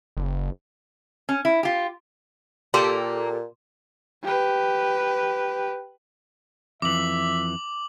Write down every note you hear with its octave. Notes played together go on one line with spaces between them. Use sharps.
F#1
C#4
E4
F4 G4
A#2 A#3 G4 A4 C6
G4 B4
F2 E3 E5 D6 F#7